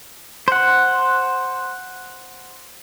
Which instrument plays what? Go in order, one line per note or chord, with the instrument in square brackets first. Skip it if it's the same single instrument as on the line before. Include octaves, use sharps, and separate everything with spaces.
[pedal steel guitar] C5 F#5